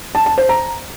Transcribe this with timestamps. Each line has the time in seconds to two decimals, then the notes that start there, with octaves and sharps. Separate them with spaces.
0.15 A5
0.26 A5
0.38 C5
0.49 A#5